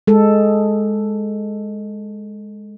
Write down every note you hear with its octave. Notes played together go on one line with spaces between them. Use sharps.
G#3 A4